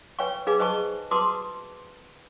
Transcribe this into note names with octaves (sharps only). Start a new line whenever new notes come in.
B4 C#5 F5 G5 G#5 C#6
D#4 G#4 B4 F5 G#5 D6
B4 C5 D#5 G#5 A5 C#6
F#4 B4 A5 C6 D6 D#6